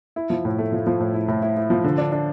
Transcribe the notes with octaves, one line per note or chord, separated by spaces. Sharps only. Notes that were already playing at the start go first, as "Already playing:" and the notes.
E4
F3
A2
A3
F3
F3
A2
E4
A2
E4
E4
F3
D3
D4
D4